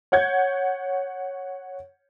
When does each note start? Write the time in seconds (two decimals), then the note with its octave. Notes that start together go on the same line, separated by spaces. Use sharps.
0.12 C#5 F#5 G6 G#6